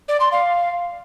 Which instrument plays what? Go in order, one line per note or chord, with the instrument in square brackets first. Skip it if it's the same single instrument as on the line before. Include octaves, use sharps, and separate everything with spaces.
[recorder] D5
C6
F5